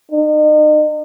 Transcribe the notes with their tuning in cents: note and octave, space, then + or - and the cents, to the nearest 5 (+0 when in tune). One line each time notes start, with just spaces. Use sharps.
D#4 -40